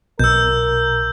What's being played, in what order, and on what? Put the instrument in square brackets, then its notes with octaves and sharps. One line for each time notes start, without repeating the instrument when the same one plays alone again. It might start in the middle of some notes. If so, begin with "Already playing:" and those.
[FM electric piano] B1 [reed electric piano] B2 [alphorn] A#4 [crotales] E6 G6